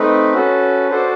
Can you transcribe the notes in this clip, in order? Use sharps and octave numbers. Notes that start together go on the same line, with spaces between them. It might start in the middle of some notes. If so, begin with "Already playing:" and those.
Already playing: A3 C4 D#4 B4
C#4 F#4 A4
D4 F#4 A4 C5